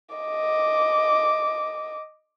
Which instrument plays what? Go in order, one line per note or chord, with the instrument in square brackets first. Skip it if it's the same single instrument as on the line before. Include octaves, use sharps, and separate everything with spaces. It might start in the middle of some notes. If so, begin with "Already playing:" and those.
[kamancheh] D#5 D6